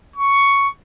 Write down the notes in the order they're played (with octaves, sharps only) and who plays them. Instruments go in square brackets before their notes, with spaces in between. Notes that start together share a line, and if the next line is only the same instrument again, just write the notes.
[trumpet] C#6